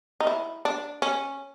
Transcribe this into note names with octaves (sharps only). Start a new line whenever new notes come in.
D#4
E4
D4
C#4